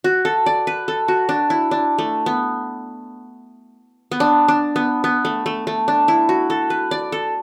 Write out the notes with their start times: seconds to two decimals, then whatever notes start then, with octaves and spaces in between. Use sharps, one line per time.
0.04 F#4
0.25 A4
0.46 D5
0.67 B4
0.88 A4
1.08 F#4
1.29 D4
1.50 E4
1.71 D4
1.98 A3
2.26 B3
4.11 B3
4.20 D4
4.48 D4
4.76 B3
5.04 B3
5.25 A3
5.46 A3
5.67 A3
5.88 D4
6.08 E4
6.29 F#4
6.50 A4
6.70 B4
6.91 D5
7.12 A4